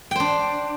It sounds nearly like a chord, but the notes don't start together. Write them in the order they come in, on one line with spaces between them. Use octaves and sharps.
G5 C5 D4